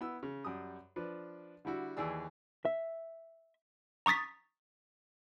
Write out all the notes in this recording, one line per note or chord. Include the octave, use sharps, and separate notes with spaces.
B3 E4 E6
C#3
F#2 G3 D#6
F3 D4 B4
D3 G3 E4 F#4
D#2 E3 G#4 D5 E6
E5
A#5 C#6 D#6 A6 B6